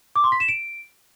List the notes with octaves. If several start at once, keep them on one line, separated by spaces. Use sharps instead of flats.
D6
C6
B6
E7
D7